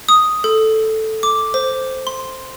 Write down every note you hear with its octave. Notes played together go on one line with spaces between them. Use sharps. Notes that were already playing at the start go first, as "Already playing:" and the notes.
D#6
A4
D6
C5
C6